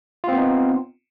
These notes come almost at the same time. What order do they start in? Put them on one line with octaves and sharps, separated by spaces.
F4 C4 B3 D#4